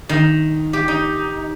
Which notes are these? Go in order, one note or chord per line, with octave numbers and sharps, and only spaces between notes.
D#3
G4
D#4